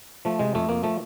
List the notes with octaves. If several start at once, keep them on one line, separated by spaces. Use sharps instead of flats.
F3 A3
C3 G#3
F2 A3
F2 A#3
F3 A3